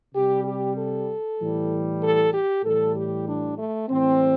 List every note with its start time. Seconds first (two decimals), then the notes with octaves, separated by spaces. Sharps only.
0.14 C3 G3 G4
0.45 G4
0.76 A4
1.39 A2 E3 G3
2.01 A4
2.33 G4
2.64 A2 E3 G3 A4
2.95 G4
3.26 D4
3.58 A3
3.89 A2 E3 G3 C4